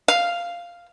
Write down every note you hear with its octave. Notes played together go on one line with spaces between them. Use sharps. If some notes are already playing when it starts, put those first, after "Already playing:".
F5